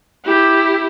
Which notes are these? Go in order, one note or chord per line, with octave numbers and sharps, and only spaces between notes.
E4 G4